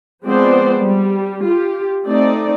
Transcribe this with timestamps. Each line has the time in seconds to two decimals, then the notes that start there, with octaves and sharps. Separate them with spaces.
0.24 F3 G#3 B3 C4 C5 D5
0.81 G3
1.42 F4 G4
2.07 A3 C4 D#4 D5